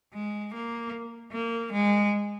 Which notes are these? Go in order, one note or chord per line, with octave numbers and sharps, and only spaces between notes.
G#3
A#3
A#3
G#3